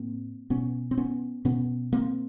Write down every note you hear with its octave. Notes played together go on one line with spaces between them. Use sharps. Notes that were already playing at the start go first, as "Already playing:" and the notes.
Already playing: A2 A#3 C4
B2 B3 C#4
C4
B3 C#4
B2 B3 C#4
A#3 C4